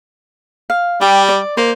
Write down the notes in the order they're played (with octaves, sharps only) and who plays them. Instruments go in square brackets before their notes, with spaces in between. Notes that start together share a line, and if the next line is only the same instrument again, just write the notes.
[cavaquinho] F5
[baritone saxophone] G3 [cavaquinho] G4
[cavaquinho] D5
[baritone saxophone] A#3 [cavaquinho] C5